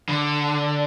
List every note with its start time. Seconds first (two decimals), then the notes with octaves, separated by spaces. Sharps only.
0.09 D3